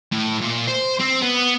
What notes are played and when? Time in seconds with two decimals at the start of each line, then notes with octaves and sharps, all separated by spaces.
0.12 A2
0.41 A#2
0.68 C5
1.00 C4
1.22 B3